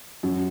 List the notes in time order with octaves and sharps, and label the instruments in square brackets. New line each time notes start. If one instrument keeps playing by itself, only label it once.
[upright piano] F#2